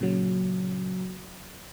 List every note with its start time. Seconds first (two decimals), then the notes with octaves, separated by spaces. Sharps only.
0.01 A#2 C#3 F#3